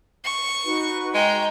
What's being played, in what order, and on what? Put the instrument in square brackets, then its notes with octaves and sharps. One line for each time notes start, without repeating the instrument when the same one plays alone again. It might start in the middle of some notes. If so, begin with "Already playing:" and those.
[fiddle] C#6
[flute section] D#4 F#4 B4
[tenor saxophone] G#3 [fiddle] G5 A#5